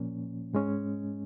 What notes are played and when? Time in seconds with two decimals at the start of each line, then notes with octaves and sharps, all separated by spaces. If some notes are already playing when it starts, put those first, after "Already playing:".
Already playing: A#2 F3 A#3 C#4
0.53 G#2 G#3 C#4